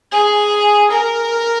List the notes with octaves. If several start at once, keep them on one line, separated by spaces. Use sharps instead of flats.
G#4
A#4